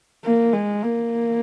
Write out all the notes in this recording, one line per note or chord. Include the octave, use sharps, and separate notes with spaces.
A#3
G#3
A#3